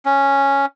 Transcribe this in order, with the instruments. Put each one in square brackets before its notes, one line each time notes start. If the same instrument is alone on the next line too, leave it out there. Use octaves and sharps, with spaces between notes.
[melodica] C#4